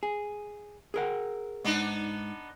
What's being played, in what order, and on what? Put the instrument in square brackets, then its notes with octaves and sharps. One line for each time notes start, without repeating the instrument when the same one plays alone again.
[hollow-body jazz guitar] G#4
G#4 A#4 F#5
[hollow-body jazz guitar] G#2 [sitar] B3 D4 D#4